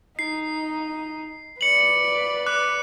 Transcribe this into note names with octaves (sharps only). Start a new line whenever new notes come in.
D#4 C7
B4 D5 C#7 F#7
D6 F#6